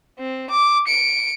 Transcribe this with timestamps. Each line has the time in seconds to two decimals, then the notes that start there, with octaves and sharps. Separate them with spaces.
0.19 C4
0.50 D6
0.87 C#7 D7